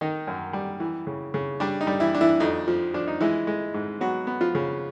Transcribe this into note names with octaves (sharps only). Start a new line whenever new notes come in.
D#3 D#4
F#2
G3
E3
C#3
C#3
G3 D4
D#4
G3
E3 E4
D4
E3 E4
F2 D#4
F3
F3 D4
D#4
E3 G#3 E4
G#3
G#2
F#3 B3 F#4
B3
F3 F4
C#3